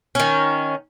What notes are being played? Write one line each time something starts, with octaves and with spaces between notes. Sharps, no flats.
D#3 C#4